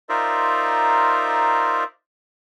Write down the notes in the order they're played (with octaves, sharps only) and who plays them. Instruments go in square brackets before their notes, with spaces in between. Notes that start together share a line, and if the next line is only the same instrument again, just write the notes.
[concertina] D#4 F4 A#4 C5 D5 E5